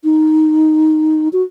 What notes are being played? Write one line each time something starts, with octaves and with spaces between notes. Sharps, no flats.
D#4
F#4